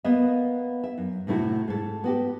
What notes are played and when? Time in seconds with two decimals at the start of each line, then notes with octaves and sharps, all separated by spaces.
0.04 A#3 B3 D#5 E5
0.84 E5
0.98 F#2
1.27 A2 C3 A3 E4 F#4
1.68 G#2 A4
2.04 B3 F#4 G4